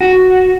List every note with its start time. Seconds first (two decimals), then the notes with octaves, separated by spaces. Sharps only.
0.01 F#4